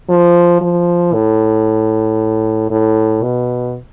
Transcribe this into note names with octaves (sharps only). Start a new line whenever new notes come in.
F3
F3
A2
A2
B2